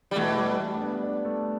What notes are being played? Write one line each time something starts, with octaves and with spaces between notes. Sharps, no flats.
G3
B2 E3 A3
G3
A3
D4
B3
D4
A3